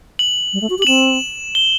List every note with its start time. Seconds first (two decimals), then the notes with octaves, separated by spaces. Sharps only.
0.19 F#7
0.53 G3
0.61 A3
0.70 F#4
0.78 G4
0.82 F#7
0.87 C4 E7
1.55 G7